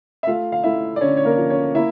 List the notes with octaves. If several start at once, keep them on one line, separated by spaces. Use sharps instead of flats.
E5
A3 F4 F5
F5
A3 E4 E5
D5
D3 C#4 C#5
C#5
A#3 A#4
F3
C#4 C#5
A#3 E4 E5